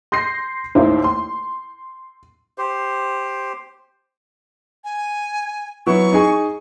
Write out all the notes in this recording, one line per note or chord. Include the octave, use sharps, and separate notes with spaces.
C6 G6 A#6 C7
A1 D#2 D#3 A#3 E4 C5
C6
G4 C5
G#5
F#3 B3 E4 C#6
D#4 G#4 G#5